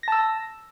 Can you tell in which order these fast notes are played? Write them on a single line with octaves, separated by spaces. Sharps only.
A#6 A5 E6